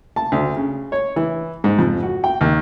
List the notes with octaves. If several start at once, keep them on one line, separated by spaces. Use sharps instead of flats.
A5
D2
C#3
C#5
E3
G#2
F2
F#4
G5
D#2